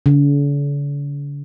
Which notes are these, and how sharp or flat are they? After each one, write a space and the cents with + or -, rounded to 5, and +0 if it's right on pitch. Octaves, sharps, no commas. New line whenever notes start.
D3 -45